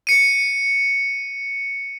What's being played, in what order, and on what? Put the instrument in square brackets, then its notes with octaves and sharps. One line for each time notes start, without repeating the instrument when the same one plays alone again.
[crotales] C#7 D#7